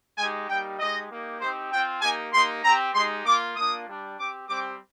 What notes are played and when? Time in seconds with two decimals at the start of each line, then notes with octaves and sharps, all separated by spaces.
0.17 G#3 D#4 G4 G#5
0.48 G3 A#3 D#4 G4 G5
0.78 G#3 D#4 G4 D#5
1.10 A#3 D#4 G4
1.40 C4 D#4 G4 C5
1.71 C4 F4 G5
2.02 A#3 D#4 G4 G#5
2.33 A#3 D#4 G4 C6
2.64 C4 G4 A#5
2.94 G#3 D#4 G4 C6
3.24 A#3 F4 D6
3.56 A#3 D4 F4 D#6
3.86 G3 D4 G4
4.17 C4 G4 D6
4.48 G3 C4 G4 D6